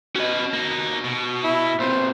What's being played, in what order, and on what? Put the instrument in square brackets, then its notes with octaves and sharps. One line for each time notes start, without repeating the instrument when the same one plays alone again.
[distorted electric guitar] C#4 B4 [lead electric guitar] F#4 D#5
[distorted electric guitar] A#3 D#4
B2
[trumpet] E4
[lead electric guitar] A#2 C4 [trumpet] C5